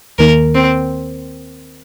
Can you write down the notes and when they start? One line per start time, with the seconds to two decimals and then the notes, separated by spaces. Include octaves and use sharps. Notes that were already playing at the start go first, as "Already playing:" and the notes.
0.19 D#2 D#3 A#3 A#4
0.55 C4